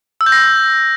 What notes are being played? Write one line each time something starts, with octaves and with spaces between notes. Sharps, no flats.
E6
G6
A#6